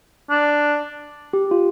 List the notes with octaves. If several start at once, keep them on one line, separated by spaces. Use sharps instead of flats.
D4
G4
F4